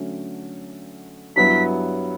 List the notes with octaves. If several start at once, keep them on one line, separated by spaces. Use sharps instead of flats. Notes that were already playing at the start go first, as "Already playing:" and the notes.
Already playing: D3 F#3 A3 C#4 F#4
G2 F#3 B3 E4 B6